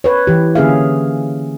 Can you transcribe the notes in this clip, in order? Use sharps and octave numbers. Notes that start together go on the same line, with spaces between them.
B4 C#5
E3 G4
D3 A#3 C#4 G#4 E5 F5